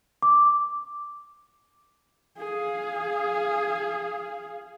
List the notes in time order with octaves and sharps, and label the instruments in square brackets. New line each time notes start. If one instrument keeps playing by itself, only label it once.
[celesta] D6
[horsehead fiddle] G#4 F5